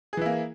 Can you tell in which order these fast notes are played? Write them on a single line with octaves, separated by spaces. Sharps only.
G#4 E3 E4 A#3